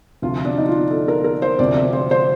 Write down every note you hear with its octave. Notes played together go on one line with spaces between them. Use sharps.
D2 C3 F3 F4
D4
D#4
F4
A4
A#4
A#4
C5
D2 C3 F3 D5
D5
C5
C5